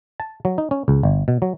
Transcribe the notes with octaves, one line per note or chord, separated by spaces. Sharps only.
A5
F#3
D#4
C#4
C#2
G1
B2
F#3